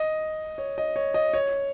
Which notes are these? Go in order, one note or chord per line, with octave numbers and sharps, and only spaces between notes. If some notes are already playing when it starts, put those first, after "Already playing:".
Already playing: D#5
C#5
D#5
C#5
D#5
C#5